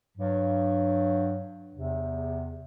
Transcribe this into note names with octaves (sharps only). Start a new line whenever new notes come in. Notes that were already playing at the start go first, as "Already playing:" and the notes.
G2 F#3
E2 C3